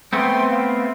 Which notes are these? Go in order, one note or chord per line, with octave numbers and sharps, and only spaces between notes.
A3 B3 C4 G5 C6
F5